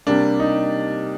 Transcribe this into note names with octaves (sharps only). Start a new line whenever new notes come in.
C3 G3 A#3 D4
D#4